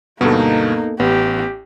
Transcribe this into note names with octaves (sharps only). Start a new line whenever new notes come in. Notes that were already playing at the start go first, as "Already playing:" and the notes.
D2 G2 B2 A#3 B3 D#4 A4
A1 B3 G4